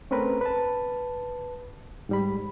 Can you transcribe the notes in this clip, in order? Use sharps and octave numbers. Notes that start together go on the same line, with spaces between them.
A3 C4 C#4 A#4 B4
B4 A5
G#2 G3 B5